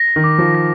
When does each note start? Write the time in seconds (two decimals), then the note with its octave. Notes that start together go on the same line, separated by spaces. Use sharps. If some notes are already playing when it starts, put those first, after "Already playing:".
Already playing: A#6
0.16 D#3
0.24 D6
0.38 F3
0.55 A#6